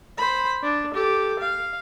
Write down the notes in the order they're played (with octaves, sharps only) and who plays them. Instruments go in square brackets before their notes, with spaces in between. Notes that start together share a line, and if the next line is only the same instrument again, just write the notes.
[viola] C5 B5
D4
G4 A4
F5